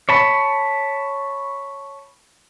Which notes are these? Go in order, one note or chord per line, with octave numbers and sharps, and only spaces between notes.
C#5 A5 B5